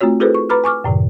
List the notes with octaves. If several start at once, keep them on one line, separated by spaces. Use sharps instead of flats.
A3 C4 F4 F#4 C#5
E4 F#4 G#4 A4 B4 C5
C#6
B4 A#5 B5 D6 F6
G#5 C#6 D6 F6
F#2 A2 C3 D#3